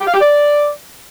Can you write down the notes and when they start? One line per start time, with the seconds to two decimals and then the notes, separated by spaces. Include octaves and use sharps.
0.01 G4
0.08 F5
0.14 G4
0.21 D5